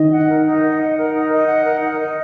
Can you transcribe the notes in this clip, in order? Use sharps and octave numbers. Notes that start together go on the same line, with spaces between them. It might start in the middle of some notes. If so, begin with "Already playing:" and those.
Already playing: D#3 D#5
F#5
A#4
D#4
D#5
F#5
A#4
D#4
D#5
F#5
A#4
D#4
D#5